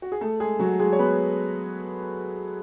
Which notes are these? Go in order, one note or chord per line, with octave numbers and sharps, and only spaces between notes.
F#4
G#4
A3 A4
G#3 G#4
F#3 F#4
G#3 G#4
C#5
B3 B4